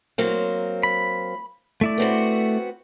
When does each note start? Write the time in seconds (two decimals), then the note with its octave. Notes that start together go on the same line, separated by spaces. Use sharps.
0.18 F#3 A#3 C4
0.83 B5
1.81 A3 E4 D5
1.98 B3 C4 F#4